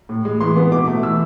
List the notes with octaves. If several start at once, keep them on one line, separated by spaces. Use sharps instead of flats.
A2
G#3
E3 C6
B3
B2 D6
A3
E3 E6